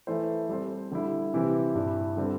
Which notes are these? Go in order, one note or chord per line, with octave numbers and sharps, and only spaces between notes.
E3 A3 E4 C5
G3 C4 A4 C5
D3 G3 E4
C3 E3 C4 E4 G4
G2 G3 E4
D3 G3 C4 A4